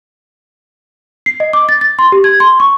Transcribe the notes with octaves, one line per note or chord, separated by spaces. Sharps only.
C7
D#5
D6
A6
A6
C6
G4
G#6
C6
C#6